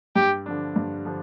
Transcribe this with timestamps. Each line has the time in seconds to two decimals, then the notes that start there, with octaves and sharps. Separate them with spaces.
0.16 G2 G4
0.46 D3 F3 D4
0.76 G2
1.05 D3 F3 D4